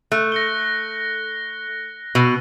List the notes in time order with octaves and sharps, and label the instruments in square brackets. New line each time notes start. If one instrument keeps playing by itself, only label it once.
[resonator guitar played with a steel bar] A3 [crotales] F#6
[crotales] A#6 C#7 G7
[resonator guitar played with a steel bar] B2 [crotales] E6 D#7